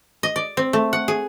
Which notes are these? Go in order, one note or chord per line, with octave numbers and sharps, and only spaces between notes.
D#5
D5
C4
A3
F#5
G#4